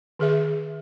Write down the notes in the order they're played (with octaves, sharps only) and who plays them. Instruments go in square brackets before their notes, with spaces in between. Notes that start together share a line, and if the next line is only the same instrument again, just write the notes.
[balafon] D#3 G#4 E5